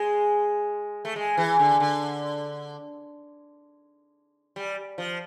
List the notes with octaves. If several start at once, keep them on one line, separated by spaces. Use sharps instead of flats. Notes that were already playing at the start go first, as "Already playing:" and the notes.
Already playing: G#3
A3
G#3
E3
D3
D3
G3
F3